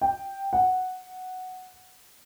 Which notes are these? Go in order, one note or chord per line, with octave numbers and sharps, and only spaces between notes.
G5
F#5